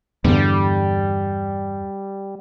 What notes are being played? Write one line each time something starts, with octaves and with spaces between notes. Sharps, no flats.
E2 G2 D3 G3